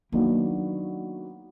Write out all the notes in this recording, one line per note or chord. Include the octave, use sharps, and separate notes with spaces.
D#3 F#3 A#3 B3 D4 F#4